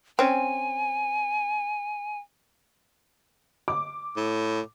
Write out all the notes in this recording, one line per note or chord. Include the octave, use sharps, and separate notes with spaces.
C4 C#4 G#5
D6
A2